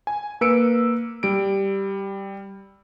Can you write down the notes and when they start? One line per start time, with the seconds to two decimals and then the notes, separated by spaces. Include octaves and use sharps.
0.07 G#5
0.41 A#3 B4 E6 C#7 D7
1.23 G3 D7